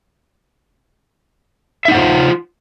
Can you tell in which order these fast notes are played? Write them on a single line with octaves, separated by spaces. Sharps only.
E5 D#4 F#5 C5 F4